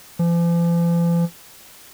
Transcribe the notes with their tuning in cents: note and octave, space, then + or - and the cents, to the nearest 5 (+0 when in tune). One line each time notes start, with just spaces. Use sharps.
F3 -45